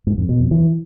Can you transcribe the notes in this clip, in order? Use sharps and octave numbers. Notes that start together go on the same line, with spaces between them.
G#2
F2
B2
F2
E3